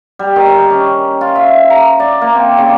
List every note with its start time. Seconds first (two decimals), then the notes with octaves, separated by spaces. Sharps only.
0.19 G3
0.36 D#3
0.70 C#4
1.21 F4
1.35 E5
1.70 A#5
2.00 D5
2.21 A#3
2.35 C4
2.58 C#3